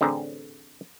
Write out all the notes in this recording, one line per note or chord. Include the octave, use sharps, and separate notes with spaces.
A1 D3 C4 G#4 A#5